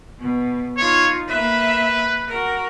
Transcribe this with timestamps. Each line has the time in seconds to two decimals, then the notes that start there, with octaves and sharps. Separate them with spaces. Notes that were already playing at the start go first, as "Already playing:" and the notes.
0.19 B2
0.77 D#4 F4 C#5
1.28 A#3 B4 E5
2.28 F#4 A#4